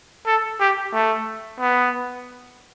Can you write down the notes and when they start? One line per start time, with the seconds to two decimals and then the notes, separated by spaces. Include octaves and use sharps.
0.26 A4
0.60 G4
0.93 A3
1.60 B3